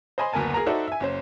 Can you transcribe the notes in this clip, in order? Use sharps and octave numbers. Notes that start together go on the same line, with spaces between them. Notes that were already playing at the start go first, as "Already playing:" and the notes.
C5 D#5 G#5 B5 C6
F#1 D2 B3 A#4 G#5 A5
G#4 A#4 A#5
D#4 F#4 A4 C5 D5 E5
E5 G#5
F#1 C#4 C5